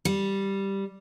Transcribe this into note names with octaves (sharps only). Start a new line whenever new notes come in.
G3